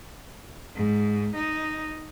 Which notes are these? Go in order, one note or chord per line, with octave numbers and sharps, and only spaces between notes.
G#2
D#4